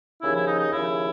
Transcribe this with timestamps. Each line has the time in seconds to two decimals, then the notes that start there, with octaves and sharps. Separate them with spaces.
0.22 D#2 C#3 F3 E4
0.34 E4
0.46 D#4
0.59 D#4
0.71 D#2 C#3 F3 E4